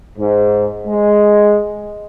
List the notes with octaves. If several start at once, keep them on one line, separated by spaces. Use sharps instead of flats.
G#2
G#3